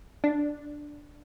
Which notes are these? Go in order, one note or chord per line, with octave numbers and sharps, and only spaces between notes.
D4